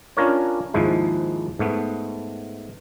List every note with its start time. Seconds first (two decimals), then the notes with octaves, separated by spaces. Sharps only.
0.17 C#4 D4 F4 A#4 C#5
0.74 D#2 G#2 F3 G#3 E4
1.59 G#2 A3 B3